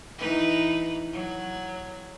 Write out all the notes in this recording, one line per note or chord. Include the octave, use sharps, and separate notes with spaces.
E3 D#4 B4
F#3